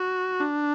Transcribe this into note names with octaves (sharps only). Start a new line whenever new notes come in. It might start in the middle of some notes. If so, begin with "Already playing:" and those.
Already playing: F#4
D4